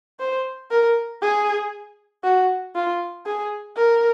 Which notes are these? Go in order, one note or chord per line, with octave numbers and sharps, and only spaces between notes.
C5
A#4
G#4
F#4
F4
G#4
A#4